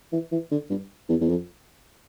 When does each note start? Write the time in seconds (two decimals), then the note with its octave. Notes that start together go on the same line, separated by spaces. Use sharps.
0.12 E3
0.32 E3
0.51 D3
0.70 G2
1.09 E2
1.21 E2
1.29 F2